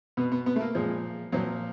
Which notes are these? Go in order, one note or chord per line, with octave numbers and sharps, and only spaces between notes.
B2 B3
B3
B3
A3
A#3
A#2 F3 G#3
A#2 F3 F#3